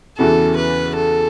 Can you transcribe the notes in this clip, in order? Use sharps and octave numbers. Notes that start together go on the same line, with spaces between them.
E2 C#3 E3 B3 F#4 A4
B4
A4